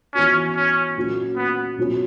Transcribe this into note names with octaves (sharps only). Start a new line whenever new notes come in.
E3 B3 C#4 F#4
C#4
A#2 F#3 C#4
B3
B2 F#3 C#4